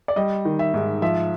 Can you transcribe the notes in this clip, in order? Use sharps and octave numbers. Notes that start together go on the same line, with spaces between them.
D5
G3 D#5
D#3
E5
G#2
F3 E5